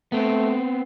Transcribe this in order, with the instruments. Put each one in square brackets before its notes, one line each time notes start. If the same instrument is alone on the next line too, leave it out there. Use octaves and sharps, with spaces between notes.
[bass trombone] A3 [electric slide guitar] B3 C4